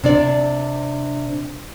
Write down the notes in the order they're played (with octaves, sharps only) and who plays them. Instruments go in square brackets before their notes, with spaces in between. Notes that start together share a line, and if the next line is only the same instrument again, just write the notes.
[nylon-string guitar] C3 D4 D5